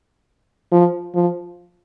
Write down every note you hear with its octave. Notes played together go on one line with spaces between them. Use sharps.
F3
F3